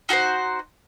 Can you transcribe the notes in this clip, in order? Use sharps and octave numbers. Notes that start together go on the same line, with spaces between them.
D#4 F#4 A4 C5